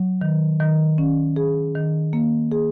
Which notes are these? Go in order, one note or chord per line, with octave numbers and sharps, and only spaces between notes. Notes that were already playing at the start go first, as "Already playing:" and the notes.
Already playing: F#3
D#3
D#3
C#4
G#4
D#3
A#3
G#4